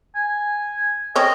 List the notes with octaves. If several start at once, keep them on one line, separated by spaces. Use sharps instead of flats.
G#5
C4 C#4 D#5